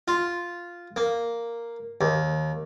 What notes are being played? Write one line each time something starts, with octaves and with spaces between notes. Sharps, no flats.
F4
A#3
D#2